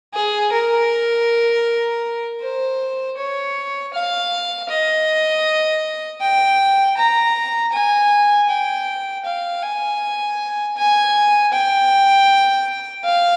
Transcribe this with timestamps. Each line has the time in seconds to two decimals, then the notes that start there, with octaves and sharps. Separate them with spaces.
0.14 G#4
0.52 A#4
2.41 C5
3.17 C#5
3.94 F5
4.69 D#5
6.21 G5
6.97 A#5
7.73 G#5
8.49 G5
9.25 F5
9.63 G#5
10.77 G#5
11.52 G5
13.04 F5